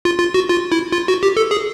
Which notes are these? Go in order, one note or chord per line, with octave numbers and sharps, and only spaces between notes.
F4
F4
F#4
F4
E4
F4
F#4
G4
A4
G#4